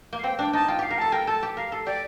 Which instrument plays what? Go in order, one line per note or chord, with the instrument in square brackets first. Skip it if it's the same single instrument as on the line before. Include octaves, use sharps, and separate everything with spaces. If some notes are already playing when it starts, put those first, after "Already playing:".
[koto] A#3
[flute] F5
[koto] C4 [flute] G5
[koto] D4 [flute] G5
[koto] D#4 [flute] A5
[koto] F4 [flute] G5
[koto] G4 [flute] F5
[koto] A#4
[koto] A4 [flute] A5
[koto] A#4 [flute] G5
[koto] A4 [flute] A5
[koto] G4
[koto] A#4 [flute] F5
[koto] A4
[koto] G4 [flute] D5